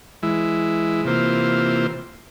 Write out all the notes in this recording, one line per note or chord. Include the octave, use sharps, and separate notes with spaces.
E3 G#3 E4
C3 E3 A#3 F4 C5